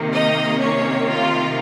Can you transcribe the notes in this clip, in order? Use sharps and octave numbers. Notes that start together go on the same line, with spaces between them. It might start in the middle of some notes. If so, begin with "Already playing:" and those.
Already playing: C3 D#3 A#3
D#4 D#5
C#4 C#5
F4